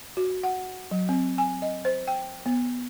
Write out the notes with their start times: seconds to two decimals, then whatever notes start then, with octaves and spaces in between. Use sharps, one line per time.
0.17 F#4
0.43 F#5
0.91 F#3
1.09 C4
1.38 G#5
1.62 D#5
1.85 C5
2.08 G5
2.46 B3